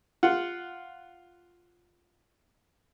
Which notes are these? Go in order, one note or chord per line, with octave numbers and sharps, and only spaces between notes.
F4 F#5